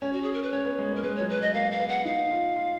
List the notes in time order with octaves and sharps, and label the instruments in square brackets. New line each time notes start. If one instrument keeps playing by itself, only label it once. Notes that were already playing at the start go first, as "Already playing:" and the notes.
[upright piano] C#4 [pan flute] C#5
[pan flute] F#4
G#4
A#4
B4
[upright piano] C#4 [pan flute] C#5
[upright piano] B3
G#3
[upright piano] A#3 [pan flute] A#4
[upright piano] G#3 [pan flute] B4
[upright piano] F#3 [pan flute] C#5
[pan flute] B4
[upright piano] G#3 [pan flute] D#5
[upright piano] A#3 [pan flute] F5
[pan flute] F5
[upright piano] B3
[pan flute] F#5
[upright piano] D#4 [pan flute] F5
[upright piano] F4
F4